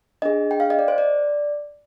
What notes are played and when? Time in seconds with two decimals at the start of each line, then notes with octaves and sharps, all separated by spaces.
0.22 D4 G#4 D#5
0.51 G5
0.60 F5
0.70 D#5
0.79 D5
0.88 C5
0.98 D5